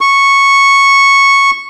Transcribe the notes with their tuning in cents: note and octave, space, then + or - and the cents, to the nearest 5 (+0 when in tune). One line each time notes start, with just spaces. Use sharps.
C#6 -5